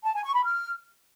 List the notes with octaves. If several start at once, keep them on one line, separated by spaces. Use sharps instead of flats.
A5
G#5
C#6
B5
F6